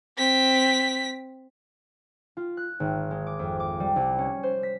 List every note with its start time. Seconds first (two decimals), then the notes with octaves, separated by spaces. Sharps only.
0.17 C4 B6
2.37 F4
2.57 F#6
2.80 G#1
3.11 G#3
3.27 D6
3.39 F2
3.60 D6
3.80 G3
3.96 C2
4.18 C#4
4.43 C5
4.63 B6